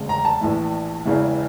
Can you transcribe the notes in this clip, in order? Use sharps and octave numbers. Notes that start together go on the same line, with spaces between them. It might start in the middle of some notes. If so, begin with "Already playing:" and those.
Already playing: E1 D2 C#3
A#5
A5
A#1 A2 E3
E1 E2 C#3 E3